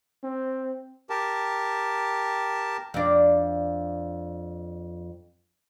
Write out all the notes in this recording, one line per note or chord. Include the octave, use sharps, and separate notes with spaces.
C4
G4 A#4 A5
F2 D4